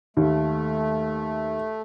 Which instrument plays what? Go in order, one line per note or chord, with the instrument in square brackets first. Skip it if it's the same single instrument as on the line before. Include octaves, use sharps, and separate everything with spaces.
[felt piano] D#2 [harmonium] A3